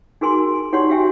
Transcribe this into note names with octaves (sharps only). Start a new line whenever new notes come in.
D#4 F#4 G#4 A#4 G#5 C6
D#4 G4 C#5 D5 F#5 C6
F#4 G4 E5 G5 G#5